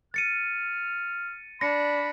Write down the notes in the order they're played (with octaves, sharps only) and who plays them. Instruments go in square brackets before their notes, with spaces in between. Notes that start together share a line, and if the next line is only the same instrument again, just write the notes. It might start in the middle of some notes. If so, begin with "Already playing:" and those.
[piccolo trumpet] F6 [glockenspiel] A6 C#7 D#7
[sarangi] D4 [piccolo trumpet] B5 [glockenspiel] A#6 C#7